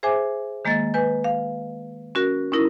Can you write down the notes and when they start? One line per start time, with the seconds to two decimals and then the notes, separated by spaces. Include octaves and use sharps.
0.03 G#4 C5 E5 G#5 D6
0.65 D#3 G#3 A#3 D#5 A6
0.94 B4 G#5 G6
1.24 F5
2.15 C#4 F#4 A#4
2.52 C#4 D#4 E4 A#4